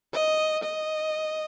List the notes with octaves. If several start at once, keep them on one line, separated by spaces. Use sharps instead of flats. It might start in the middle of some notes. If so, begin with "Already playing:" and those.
D#5
D#5